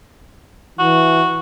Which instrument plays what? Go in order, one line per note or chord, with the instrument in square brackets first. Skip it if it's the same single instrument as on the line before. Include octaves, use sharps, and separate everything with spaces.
[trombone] E3 [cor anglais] F#4